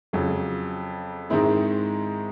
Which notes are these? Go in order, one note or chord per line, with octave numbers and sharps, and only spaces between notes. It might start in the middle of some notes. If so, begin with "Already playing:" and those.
F2 C#3 F#3
G#2 D#3 G#3 C4 E4